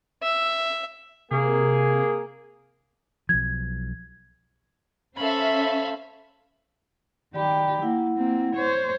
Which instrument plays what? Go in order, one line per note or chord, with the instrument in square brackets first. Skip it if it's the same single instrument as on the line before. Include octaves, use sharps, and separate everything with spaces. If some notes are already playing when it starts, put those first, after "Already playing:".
[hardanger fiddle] E5
[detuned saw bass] C3 [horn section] A#3 G#4
[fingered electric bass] B1 F3 [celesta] G#6
[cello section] C#4 C5 [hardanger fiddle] A4 B5 [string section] E5 F5
[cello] D#3 G4 [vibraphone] D5 G5 B5
[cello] A#3 [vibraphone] E4 F#5
[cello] A#3 C4
C5 C#5